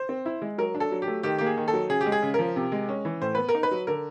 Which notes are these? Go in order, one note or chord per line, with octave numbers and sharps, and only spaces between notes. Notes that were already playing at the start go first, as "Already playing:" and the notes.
Already playing: C5
C4
E4
G#3
F#3 A#4
D4
A4
F#3
G4
A3
D#3 G4
A#3 G4
G#4
D#3
A4
F#3
C#3 G#4
G4
G#3
G#4
C#3
F3 A#4
C3
G#3
C#4
E3
A2 C5
B3 B4
A#4
D#4
B4
F#3
D3 A#4